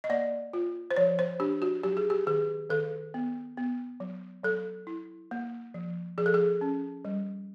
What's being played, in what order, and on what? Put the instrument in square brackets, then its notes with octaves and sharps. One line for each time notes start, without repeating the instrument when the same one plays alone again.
[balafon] D#5
A#3 D5
F4
C5
F3 C#5
C5
D4 G4
F#4
F#3 G4
G#4
G4
D#3 G#4
D#3 A4
B3
B3
F#3
F#3 A4
E4
A#3
F3
F3 G#4
A4
G#4
C#4
G3